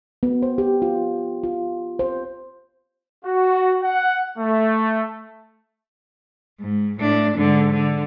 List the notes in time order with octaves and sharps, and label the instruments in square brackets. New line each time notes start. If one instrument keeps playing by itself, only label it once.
[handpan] B3
C5
G4
F4
F4
C5
[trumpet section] F#4
F#5
A3
[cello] G#2
A2 D4
G#2 D3
D3